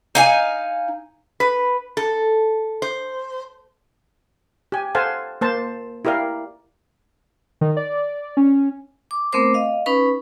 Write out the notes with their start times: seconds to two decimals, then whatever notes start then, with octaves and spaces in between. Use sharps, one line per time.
0.15 D#4 F5 G#5
1.40 B4
1.97 A4
2.82 C5
4.72 G4 G#5
4.95 A4 C5 F5 F#5 G#5 A5
5.41 A#3 C5 A5
6.05 E4 G4 A#4 D5 F5
7.61 D#3
7.77 D5
8.37 C#4
9.11 D6
9.33 A3 B3 C4 A#4 C5 D6
9.54 D#5 F5
9.86 C#4 D#4 B4 B5